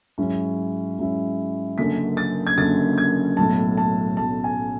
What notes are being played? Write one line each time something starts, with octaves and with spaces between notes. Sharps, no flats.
G#2 F#3 C#4 E4
G#2 F#3 C#4 E4
F#1 F#2 D3 F#3 C#4 B6
A6
G#6
F#1 F#2 D3 F#3 C#4 A6
G#6
B1 A2 F#3 A5
A5
B1 A2 F#3 A5
G#5